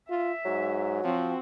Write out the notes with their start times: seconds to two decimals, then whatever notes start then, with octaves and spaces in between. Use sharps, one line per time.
0.10 F4 E5
0.45 G#2 F#3
1.04 F3 C4 F#4